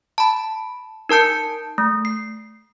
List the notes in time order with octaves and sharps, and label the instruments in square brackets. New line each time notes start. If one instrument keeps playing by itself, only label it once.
[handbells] A5 B5
D#4 A#4 A5 G6 C#7
A3
C7